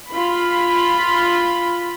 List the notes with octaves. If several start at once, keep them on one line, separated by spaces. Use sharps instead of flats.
F4 B5